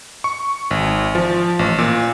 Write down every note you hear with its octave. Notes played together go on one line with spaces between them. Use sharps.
C#6
G#1
F3
A1
A#2